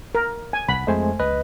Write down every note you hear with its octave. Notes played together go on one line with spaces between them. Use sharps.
A#4
G#5
C2 F#5 B5
F2 G#3 A3 C5 G#5
C#2 B4 D#5